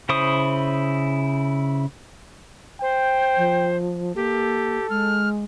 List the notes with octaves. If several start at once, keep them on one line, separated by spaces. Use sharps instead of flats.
C#3 E4 C5 C#6 D#6
C5 G5
F3
A#3 G4 A4
G#3 F6